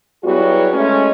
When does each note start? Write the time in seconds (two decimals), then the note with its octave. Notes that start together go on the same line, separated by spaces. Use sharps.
0.24 F#3 G3 B3 E4 F#4 G#4
0.73 G#3 A3 C#4